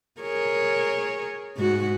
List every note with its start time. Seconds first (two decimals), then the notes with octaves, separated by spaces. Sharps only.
0.21 G#4 A#4 C#5
1.57 G#2 F#4